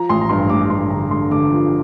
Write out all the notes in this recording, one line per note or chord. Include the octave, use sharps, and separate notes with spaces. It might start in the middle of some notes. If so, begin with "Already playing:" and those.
Already playing: F3 A#5
A1 C6
A#5
G2 C6
A1 D6
D6
G2 C6
D3 A#5
D3 C6
D3 D6
F3